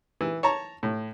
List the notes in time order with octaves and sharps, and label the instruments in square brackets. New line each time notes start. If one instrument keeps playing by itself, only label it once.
[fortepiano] E3
C#5 A5 A#5
A2